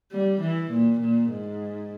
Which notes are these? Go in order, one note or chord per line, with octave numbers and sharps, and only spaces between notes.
G3
E3
A#2
A#2
G#2